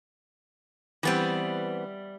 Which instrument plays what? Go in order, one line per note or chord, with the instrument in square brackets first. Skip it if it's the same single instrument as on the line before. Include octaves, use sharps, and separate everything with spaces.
[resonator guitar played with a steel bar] E3 B3 C4 [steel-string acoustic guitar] G3 D5 E5